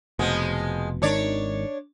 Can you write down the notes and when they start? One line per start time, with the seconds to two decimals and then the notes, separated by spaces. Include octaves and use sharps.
0.19 F1 B2 F3 G#3 B3
1.02 G#1 D#3 D4 C#5 D5